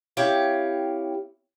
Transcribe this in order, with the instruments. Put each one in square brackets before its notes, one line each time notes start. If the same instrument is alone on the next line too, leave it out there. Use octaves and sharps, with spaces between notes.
[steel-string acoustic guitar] C4 E4 G4 C#5 F5